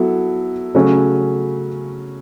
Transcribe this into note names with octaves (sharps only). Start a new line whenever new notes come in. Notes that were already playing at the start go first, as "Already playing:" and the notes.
Already playing: F#3 B3 E4 A4
C#3 F#3 A3 C#4